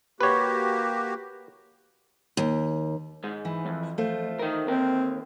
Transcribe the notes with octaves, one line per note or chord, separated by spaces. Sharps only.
A#3 F#4 G4 B4 C#5
D#2
G#2 G#3
E3
F2
A3 F4 C5
D#3 A#4
D#2 C4 A#4